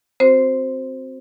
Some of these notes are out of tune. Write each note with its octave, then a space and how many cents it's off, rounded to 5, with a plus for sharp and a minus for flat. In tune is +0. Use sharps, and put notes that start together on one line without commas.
C4 +0 F#4 -5 C5 +0